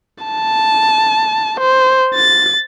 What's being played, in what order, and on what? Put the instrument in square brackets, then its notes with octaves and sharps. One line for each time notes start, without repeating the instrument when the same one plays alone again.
[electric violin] A5
C5
A6